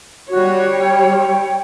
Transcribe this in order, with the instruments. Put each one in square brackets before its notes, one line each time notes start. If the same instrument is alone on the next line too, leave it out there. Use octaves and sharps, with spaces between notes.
[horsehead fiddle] G3 C#5 [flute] F#4
[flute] G5